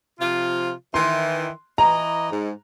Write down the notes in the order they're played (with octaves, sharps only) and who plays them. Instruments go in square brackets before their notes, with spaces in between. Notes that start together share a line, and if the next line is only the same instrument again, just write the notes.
[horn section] C3 F3 F4
[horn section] D#3 E3 [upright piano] C6
[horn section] E3 D#5 [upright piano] A#5
[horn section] G#2